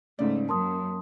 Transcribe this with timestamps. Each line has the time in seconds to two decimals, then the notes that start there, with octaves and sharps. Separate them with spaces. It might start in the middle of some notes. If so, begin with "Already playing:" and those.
0.19 G#2 C#3 A3 D5
0.49 F#2 A#3 A5 C6 D#6